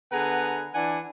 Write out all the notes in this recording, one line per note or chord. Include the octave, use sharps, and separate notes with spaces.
D3 B3 G#4 B4 F#5 A#5
E3 D4 F#5 G#5